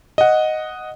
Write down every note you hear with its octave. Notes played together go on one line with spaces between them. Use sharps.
D#5 F#5